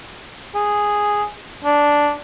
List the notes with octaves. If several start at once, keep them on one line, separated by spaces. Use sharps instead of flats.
G#4
D4